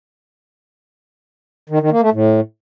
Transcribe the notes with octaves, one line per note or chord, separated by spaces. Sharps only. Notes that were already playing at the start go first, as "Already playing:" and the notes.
D#3
D#3
A#3
A3
A2